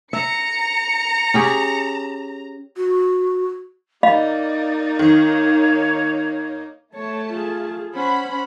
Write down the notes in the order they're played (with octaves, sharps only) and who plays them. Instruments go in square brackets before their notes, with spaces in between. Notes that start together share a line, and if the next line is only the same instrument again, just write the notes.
[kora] E5 [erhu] A#5 [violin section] C#7
[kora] C#4 G4 G#4
[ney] F#4
[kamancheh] A#3 D#4 [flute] D5 [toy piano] D#5 F5 B5
[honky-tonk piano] D#3 [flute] C#5
[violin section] A3 A5 [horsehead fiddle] C#5
[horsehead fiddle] F4 G#4
[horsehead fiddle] C#4 [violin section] C5 F#5 B5